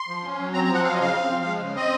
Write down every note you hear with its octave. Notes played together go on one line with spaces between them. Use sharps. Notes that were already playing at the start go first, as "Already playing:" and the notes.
Already playing: C6
F3
C#4
F#3
C4 A#5
A#5
F3
F#5
F#3 F5
D#5
C#3 F5
C4
F3
G#3
C#3
C4 D#5